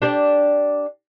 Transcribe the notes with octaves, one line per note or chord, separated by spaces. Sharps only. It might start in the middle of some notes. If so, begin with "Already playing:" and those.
D4 G4 D5